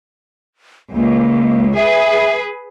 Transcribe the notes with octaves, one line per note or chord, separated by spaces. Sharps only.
C#2 A#3
G#4 B4 E5